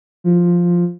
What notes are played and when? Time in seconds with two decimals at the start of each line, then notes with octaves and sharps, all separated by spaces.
0.24 F3